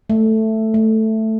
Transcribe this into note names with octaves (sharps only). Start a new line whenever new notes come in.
A3
A3